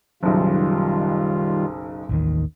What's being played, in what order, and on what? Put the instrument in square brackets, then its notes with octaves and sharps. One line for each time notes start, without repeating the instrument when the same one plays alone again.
[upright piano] F#1 B1 [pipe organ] D#3 G3 F4
[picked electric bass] A1 D#2 D#3